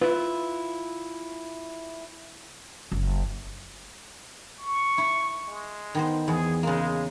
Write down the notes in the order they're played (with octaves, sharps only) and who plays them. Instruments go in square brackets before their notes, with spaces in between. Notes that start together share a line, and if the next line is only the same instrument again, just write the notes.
[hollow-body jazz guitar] E4 F4 [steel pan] B4
[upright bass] F#1
[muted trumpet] C#6
[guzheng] E4
[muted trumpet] G#3
[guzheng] D#3 B3 C5
[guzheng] E2 [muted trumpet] G#4
[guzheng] C#3 A#3 [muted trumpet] G#3